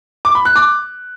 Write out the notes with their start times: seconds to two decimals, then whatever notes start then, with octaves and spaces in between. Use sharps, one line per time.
0.25 D6
0.35 B5
0.45 F#6
0.56 D6